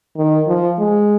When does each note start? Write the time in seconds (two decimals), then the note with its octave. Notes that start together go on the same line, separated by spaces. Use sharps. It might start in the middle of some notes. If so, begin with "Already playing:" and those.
0.16 D#3
0.47 F3
0.79 G#3